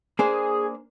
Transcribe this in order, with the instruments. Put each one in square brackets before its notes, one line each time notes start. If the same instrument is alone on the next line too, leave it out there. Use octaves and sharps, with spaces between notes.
[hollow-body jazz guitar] A#3 D4 C5 [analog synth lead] G#4